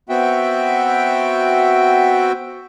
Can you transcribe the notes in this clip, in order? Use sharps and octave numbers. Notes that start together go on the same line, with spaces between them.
B3 C4 F#4 E5 G5